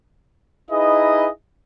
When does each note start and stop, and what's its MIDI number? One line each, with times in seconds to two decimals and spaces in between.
0.71 1.28 63
0.71 1.28 64
0.71 1.28 68
0.71 1.28 71
0.71 1.28 75